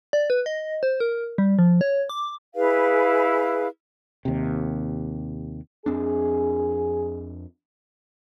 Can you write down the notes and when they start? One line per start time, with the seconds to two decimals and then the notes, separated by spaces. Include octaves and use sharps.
0.13 D5
0.30 B4
0.46 D#5
0.83 C5
1.00 A#4
1.38 G3
1.59 F3
1.81 C#5
2.09 D6
2.54 E4 G#4 B4 F5
4.25 D#2 C3
5.86 F2 C4 D4 G#4